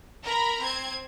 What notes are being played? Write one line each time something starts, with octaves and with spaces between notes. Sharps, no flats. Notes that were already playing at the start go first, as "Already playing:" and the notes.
A#4 A#5 B5
C4 G#6